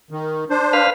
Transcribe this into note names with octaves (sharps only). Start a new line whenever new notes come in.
D#3
D4 C5
B4 F5